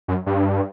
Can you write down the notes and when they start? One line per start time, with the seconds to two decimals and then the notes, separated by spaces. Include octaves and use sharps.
0.08 F#2
0.26 G2